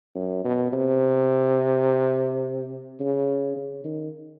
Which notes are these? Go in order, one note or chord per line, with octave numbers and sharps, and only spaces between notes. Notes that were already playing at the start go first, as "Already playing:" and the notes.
F#2
B2
C3
C#3
C#3
D#3